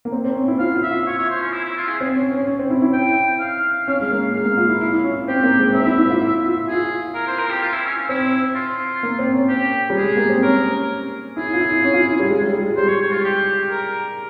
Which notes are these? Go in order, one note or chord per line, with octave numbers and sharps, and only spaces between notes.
A#3
C4
C4
C#4
E4
F4 F5
F4
E5
F4
C#5
C#5
C5
C#4
E4
E4
F4
G#4
C4
C#4
C#4
C#4
C4
E4
E4
G5
F5
C#4 F5
G#3
A#3
G#3 F5
A#3
F4
E4
E4
C#4
C4 G4
A#3
G#3
C4 E5
E4
E4
F4
E4
F4
F4 G#4
A#4
C5
A#4
G4
F4
E4
C#4
C#4
C4 E4
F4
A#3
C4
C#4
G4
G3
G#4
G#3
A#3
C4
C#4 A#4
E4 G#4
F4
E4
C#4
F4
E4
G3
G#3
G3
G3
G#3
G3 C5
C#5
C#5
F4
G4
A#4